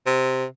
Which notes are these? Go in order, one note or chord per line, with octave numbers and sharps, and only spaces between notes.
C3